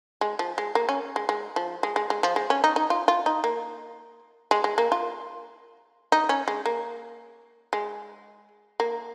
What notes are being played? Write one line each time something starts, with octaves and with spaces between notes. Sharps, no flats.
G#3
F3
G#3
A#3
C#4
G#3
G#3
F3
G#3
G#3
G#3
F3
G#3
C#4
D#4
D#4
F4
F4
D#4
A#3
G#3
G#3
A#3
F4
D#4
C#4
G#3
A#3
G#3
A#3